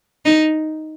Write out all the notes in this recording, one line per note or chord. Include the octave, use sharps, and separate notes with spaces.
D#4